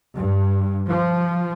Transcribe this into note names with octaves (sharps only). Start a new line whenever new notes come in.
G2
F3